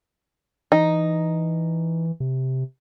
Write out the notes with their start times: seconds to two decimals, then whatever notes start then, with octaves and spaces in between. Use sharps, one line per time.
0.72 E3 D#4
2.20 C3